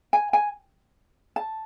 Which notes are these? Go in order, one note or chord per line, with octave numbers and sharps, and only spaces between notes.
G#5
G#5
A5